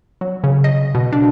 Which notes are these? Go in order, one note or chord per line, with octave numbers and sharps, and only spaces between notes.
F#3
C#3
D#5
B2
D4